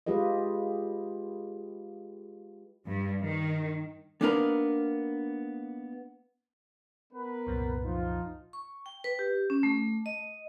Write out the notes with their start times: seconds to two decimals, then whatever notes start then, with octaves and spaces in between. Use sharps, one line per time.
0.06 G#3 F4 G4 B4 D#5
2.87 G2
3.24 D#3
4.21 A#3 B3 D4 D#4 A#4 B4
7.13 B3 A#4 B4
7.47 C2 F#2 A#2
7.85 F3 D#4 F4
8.53 C#6
8.86 G5
9.04 B4
9.19 G4
9.50 C#4
9.63 A3
10.06 D#5